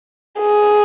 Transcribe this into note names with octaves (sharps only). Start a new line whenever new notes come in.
G#4